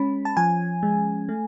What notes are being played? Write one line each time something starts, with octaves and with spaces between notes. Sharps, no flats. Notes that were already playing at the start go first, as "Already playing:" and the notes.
Already playing: G#3 C#4 B5
A5
F3 G#5
G#3
A3